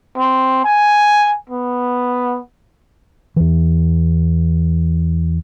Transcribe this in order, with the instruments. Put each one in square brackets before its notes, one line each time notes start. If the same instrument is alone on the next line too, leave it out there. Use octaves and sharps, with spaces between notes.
[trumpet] C4
G#5
B3
[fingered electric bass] E2 E3